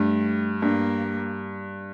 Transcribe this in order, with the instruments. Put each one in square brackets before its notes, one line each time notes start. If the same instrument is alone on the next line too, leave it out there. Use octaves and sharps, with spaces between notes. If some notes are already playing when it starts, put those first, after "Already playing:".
Already playing: [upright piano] G2 [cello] A3
[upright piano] G2 [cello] A#3